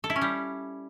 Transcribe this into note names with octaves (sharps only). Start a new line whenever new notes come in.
A4
E4
C#4
G3